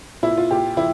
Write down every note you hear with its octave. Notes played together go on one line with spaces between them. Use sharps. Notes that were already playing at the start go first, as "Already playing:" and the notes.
A#2 E4
F4
A#2 G4
F3 E4